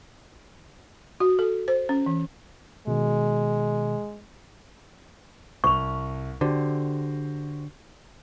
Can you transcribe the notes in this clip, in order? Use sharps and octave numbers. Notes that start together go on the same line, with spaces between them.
F#4
A4
C5
C#4
E3
B2 D#3 G#3
C2 C#6 F7
D3 F#4 G4 C5